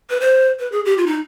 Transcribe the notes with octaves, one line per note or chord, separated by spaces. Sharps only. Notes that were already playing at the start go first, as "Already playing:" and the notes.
B4
C5
B4
G#4
G4
F4
D#4